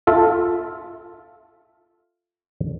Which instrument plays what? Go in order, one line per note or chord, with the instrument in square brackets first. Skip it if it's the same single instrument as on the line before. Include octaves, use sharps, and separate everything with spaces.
[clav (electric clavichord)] F4 A4 E5